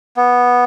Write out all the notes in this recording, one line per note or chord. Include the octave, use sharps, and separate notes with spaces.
B3